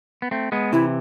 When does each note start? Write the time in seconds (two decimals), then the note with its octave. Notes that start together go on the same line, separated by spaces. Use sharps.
0.22 B3
0.31 A3 C4
0.52 G#3 B3
0.72 C3 E3 E4